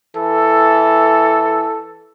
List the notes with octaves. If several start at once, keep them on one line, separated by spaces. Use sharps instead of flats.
E3 A4